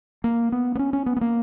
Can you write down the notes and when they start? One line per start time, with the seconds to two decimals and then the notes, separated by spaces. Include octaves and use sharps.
0.24 A#3
0.52 B3
0.75 B3
0.79 C#4
0.93 C#4
1.06 B3
1.17 B3
1.21 A#3